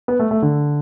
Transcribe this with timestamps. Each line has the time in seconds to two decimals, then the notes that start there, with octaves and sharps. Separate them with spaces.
0.08 B3
0.20 A3
0.31 A3
0.42 D3